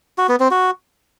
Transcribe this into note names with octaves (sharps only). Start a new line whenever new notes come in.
F#4
B3
C4
F#4